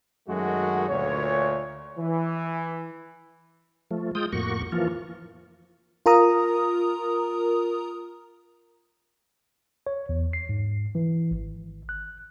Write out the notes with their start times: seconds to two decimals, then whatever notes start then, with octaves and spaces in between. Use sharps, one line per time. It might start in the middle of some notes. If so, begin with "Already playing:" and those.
0.29 F#2 D#3 G#3 A3 F#4
0.89 D2 A#2 C#5
1.98 E3
3.91 F3 A3
4.15 G#3 F4 G5 D#6
4.33 F2 A2 A#3 F#4 C#6
4.72 E3 F3 A#3 F4
6.06 F4 A#4 A#5 D#6
9.87 C#5
10.09 E2
10.33 C7
10.49 G#2
10.95 E3
11.31 G#1
11.89 F#6